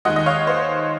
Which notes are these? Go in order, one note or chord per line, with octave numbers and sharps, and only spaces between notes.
D#2 D#3 G#3 D#5 F#5
D#5
C#5 F5
C5